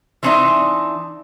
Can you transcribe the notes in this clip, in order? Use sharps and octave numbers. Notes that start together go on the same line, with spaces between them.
E3 A3 C4 D4 D#4 E5